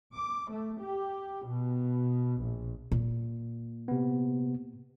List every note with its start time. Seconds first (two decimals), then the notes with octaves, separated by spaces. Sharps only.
0.15 D6
0.51 A3
0.82 G4
1.47 B2
2.40 A#1
2.92 A#2
3.88 C3 B3